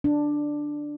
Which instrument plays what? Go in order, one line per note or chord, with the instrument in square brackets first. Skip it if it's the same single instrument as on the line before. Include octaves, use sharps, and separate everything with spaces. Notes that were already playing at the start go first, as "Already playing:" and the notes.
[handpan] D4